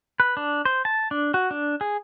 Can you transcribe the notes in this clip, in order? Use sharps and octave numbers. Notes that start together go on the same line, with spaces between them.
B4
D4
C5
A5
D4
F#4
D4
G#4